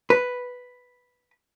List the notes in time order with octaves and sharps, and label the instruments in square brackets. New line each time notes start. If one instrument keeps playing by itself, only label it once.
[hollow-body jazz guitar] B4